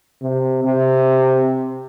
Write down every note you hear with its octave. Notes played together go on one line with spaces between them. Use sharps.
C3
C3